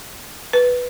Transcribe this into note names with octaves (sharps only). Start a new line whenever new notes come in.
B4